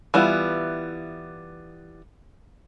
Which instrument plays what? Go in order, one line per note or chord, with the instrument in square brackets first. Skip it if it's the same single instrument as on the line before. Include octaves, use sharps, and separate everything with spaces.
[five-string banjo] E3 G3 B3 E4 F4